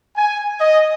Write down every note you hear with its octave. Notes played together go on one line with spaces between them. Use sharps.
G#5
D#5